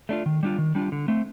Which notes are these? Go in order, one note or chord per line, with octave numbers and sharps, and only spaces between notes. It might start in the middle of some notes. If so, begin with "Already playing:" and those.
A3 D4 F4
D#3
G3 D4 F4
D#3
G3 D4 F4
D3
A3 C4